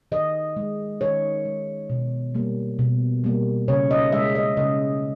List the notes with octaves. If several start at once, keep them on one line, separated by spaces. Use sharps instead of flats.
D#3 D#5
G#3
D#3 C#5
G#3
B2
G3 A#3
B2
G3 A#3
C#3 C#5
D#5
G#3 E5
D#5
C#3 D#5